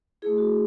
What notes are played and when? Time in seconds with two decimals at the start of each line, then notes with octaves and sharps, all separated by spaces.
0.22 A3 E4 G#4
0.38 F#4